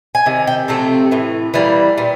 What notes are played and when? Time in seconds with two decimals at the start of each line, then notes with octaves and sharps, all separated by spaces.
0.15 G#5
0.26 C3 D#3
0.47 G5
0.68 C3 F3 A3 C4
1.11 A2 E3
1.54 E3 G3 A#3
1.98 A#2 G3